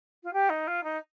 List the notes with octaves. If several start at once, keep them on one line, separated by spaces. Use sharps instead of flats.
F4
G4
D#4
F4
D#4